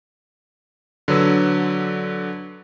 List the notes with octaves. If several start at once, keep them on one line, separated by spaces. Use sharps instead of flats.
D3 F#3 B4 E6